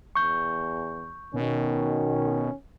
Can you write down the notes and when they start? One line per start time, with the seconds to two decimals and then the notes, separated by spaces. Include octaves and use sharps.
0.16 E2 C#6 G6
1.34 B2 D#3 C#4